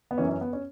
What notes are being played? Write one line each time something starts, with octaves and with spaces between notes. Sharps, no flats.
B3
F#2 E3 C#4
C#4
B3
C#4